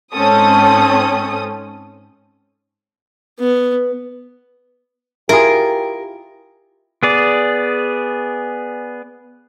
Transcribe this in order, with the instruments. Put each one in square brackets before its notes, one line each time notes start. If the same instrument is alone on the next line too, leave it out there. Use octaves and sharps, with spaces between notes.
[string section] G#2 C4 C#4 A4 D#6
[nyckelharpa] B3
[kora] E4 F4 G#4 [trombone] G4 [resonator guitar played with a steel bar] A#4
[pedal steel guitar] B3 G#4 D5